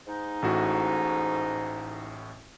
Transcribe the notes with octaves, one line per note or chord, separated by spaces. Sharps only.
G#2 D#4
A1 A2 F#4